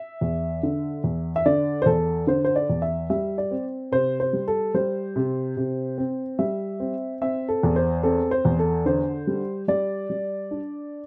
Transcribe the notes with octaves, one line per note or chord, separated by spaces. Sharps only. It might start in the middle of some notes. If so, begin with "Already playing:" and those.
Already playing: E5
E2
D3
E2
E5
D3 D5
C5
E2 A4
D3 C5
C5
D5
E2
E5
G3 E5
D5
C4
C3 C5
C5
G3
A4
G3 C5
C3
C3
C4
G3 E5
C4
C4 E5
A4
E2
C5
C4 A4
C5
E2
A4
D3 C5
G3
G3 D5
G3
D4